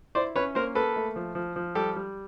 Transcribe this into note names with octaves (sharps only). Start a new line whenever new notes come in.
E4 C5 D5
C#4 B4 C#5
A#3 A#4 C5
A#3 A4 B4
A3
F3
F3
F3
G3 G4 A4
G3